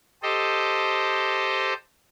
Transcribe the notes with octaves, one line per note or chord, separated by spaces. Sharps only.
G4 A4 C5 D#5